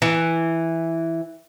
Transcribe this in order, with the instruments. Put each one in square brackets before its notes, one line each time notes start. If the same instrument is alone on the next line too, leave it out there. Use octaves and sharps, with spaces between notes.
[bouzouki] E3